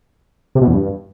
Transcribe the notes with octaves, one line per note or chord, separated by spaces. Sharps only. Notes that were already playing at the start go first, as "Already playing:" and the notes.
C3
B2
E2
G2